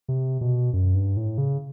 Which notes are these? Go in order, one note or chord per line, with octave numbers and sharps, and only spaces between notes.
C3
B2
F#2
G2
A2
C#3